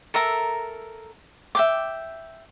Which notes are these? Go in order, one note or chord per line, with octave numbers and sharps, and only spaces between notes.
A4 A#4 E5 A#5
E5 G5 D6